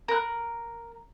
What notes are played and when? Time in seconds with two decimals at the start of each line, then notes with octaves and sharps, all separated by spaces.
0.08 A#4 F#6